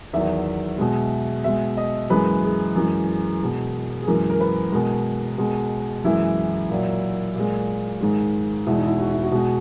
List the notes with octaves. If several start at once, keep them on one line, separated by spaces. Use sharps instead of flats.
E2 D#3 F#3 E5
B2 G#3
B2 G#3 E5
D#5
F#2 E3 G#3 B4
G#4
F#2 E3 G#3
B2 G#3
G#4
F#2 E3 G#3 A#4
A#4
B4
B2 G#3 A#4
B2 G#3
F#2 E3 G#3 E4
A#2 F#3
A#2 G#3
G#2 D#3 G#3
E2 B2 G#3 E4
D#4
E4
F#4
E4
F#4
B2 G#3